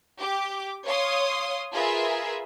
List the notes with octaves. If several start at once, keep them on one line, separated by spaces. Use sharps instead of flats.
G4 D6
C#5 F5 C6 D#6
F4 G#4 A#4 B4 E5